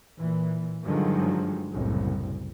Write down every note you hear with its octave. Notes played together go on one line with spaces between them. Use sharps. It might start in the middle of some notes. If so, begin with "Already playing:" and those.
A#2 E3
G2 D3 D#3 F3 F#3 G#3
F#1 C2 F#2 A2